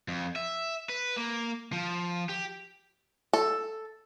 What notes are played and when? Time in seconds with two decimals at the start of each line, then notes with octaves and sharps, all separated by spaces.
0.08 F2
0.36 E5
0.89 B4
1.17 A#3
1.73 F3
2.29 G4
3.33 A4